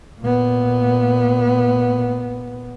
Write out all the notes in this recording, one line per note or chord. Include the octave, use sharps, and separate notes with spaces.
A#2 B3